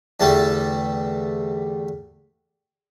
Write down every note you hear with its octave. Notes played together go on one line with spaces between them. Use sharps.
E2 D3 G3 A3 A5